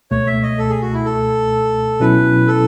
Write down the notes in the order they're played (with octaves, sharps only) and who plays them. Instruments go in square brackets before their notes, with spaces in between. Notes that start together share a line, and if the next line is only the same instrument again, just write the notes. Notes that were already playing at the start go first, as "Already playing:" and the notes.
[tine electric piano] C#2 B2 A3 [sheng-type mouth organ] C#5
[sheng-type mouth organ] E5
D#5
A4
G#4
F#4
E4
A4
[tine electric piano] B2 F#3 C#4 E4 [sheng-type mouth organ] B4
[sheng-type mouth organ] A4